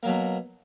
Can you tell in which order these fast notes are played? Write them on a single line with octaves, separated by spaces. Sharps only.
A#3 F#3 B2